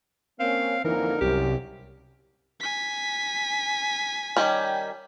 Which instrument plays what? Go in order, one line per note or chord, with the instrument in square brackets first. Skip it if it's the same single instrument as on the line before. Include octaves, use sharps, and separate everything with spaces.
[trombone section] A#3 C#4 [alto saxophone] C4 [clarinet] F5
[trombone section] F2 D3 A#3 [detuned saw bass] E3 [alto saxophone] D#4 [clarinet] A#4
[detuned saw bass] C2 [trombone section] F#2 [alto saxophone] G4
[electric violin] G#5 B6
[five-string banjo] D#3 G3 C#4